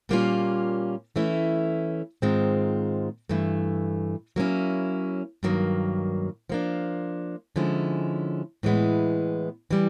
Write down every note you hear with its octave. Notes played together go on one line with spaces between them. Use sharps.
A#2 G3 A#3 C#4 F4
E3 A3 C#4 E4
G#2 D#3 G#3 C4 F4
G2 E3 A3
F#3 A#3 C#4 E4
G2 D#3 F#3 A#3
F3 A#3 D4
D3 F3 G#3 C#4 E4
A2 E3 G#3 B3
E3 G3